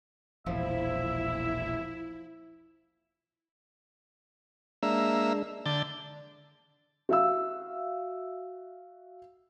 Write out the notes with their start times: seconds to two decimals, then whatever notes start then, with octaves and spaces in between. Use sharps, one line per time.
0.46 E1 A#1 F3 E4 E5
4.83 G#3 A#3 D4 E5
5.66 D3 G6 A6
7.09 F#4 E5 F5 E6